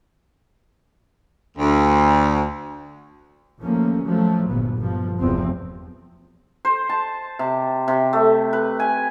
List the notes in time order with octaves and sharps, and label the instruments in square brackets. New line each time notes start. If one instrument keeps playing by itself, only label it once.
[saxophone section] D2
[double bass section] D#2 F3 A3 A#3 C#4
F3 F#3 A3
G1 A#2 B3
G1 B2 F3
F1 B1 E2 F3 C4
[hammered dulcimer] C5
A5
C3
C3
A3
B4
G#5